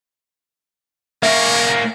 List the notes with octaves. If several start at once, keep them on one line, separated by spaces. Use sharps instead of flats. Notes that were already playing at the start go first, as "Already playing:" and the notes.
A#3 C#4 A#4 E5